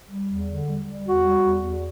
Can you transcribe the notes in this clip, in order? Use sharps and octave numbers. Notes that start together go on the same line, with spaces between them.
G3
E2
D3
G3
G3
E2 F#4
G3
E2
E2